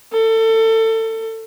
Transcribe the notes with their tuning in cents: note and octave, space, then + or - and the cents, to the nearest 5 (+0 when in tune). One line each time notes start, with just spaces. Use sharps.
A4 +25